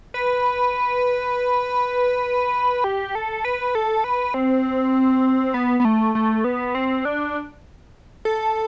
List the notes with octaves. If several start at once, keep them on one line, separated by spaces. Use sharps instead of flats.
B4
G4
A4
B4
A4
B4
C4
B3
B3
A3
A3
B3
C4
D4
A4